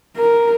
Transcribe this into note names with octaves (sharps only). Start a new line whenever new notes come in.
A#4